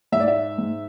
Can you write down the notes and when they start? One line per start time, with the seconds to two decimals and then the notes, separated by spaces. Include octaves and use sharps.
0.12 G#2 E5
0.20 D5
0.28 E5
0.58 G#2